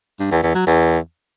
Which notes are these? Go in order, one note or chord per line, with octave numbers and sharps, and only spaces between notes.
G2
E2
E2
F#3
E2